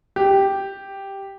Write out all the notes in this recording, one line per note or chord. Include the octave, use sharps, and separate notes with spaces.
G4